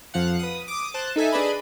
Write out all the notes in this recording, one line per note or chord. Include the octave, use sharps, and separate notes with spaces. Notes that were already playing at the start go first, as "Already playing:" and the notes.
F2 F3 F5 F#5
B4 D#6
D6 D#6
C5 A5 F#6
D#4 A4 E5 G#5
D4 G#4 B4 D5 D#5 B5